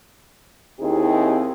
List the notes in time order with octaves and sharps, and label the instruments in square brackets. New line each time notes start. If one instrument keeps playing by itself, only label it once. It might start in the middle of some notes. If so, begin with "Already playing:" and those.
[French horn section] D#2 C4 D#4 E4 G4 G#4